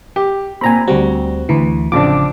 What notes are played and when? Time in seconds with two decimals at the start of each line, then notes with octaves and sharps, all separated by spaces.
0.16 G4
0.61 A#2 C4 G#5 A#5 B5
0.88 D2 G3 C4 F#4
1.49 D2 E3
1.92 A1 C#3 F3 C4 D4 D6